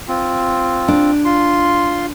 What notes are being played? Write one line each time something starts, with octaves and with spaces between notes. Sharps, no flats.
C4 F4
D4
F4 C6